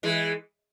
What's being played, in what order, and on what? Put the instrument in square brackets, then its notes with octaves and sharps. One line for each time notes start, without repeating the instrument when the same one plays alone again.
[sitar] E3 G#3